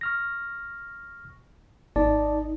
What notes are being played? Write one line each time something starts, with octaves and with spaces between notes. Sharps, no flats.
C#6 F6 A#6
G#1 D#4 D5 A5